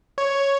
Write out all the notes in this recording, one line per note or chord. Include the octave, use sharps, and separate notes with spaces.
C#5